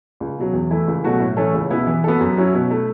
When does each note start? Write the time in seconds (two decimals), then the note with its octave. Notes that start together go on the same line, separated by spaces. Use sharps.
0.20 C#2
0.38 B2 F#3
0.53 E2
0.71 E3 A3 E4
0.88 C#2
1.04 B2 F#3 A3 F#4
1.20 A2
1.37 E3 A3 C#4 A4
1.54 C#2
1.71 B2 B3 E4
1.87 E3
2.04 B3 F#4 A4
2.21 F#2
2.37 F#3 C#4 E4
2.54 B2
2.70 A3 E4